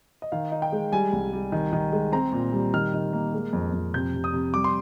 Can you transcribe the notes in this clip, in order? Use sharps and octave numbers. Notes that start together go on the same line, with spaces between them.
D#5
D#3 F5
D#4
G5
G#3
G3 G#5
C2
G3
D#3
D#3
G#3
C4 A#5
A#2
G3
D#3 F6
D#3
A#3
G#3
F2
F2
C3 G6
C3
D#6
C3
G3 D6
C6